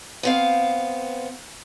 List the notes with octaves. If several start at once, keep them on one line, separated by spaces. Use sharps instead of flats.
B3 C4 F5